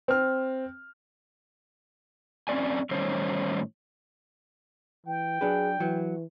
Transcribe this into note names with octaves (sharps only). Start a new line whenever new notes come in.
C4 F6
F#2 C4 C#4 D5 G#5
A2 D#3 G3 C#4 C5 C#5
E3 G5
F#3 D4 G#4 B4
E3 F#3